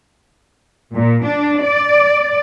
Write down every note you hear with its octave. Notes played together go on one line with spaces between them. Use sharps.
A#2
D4
D5